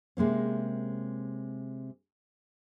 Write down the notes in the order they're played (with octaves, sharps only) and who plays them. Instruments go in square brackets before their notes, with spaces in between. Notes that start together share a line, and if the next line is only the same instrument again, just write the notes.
[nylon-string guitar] C3 G#3 A#3 C#4